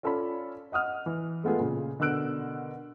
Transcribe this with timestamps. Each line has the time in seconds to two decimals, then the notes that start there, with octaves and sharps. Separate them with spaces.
0.03 C#4 F4 A4 C#5 D5 B5
0.72 D#5 F#5 D#6 F6
1.06 E3
1.44 G#3 A3 B3 F4 G#4
1.59 A#2 C#3
1.99 B2 D3 A#4 E6 F#6 D7